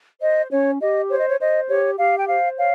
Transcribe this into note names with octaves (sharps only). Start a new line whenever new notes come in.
C5 D#5
C#4 C#5
G4 D#5
C5 C#5
D#5
C#5
C5 D#5
G4 C#5
G4 F5
G5
C5 F5
C#5 F5